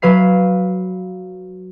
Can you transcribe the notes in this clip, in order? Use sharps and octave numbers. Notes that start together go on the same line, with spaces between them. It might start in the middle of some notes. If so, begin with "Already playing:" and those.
F#3 B4 F5 C7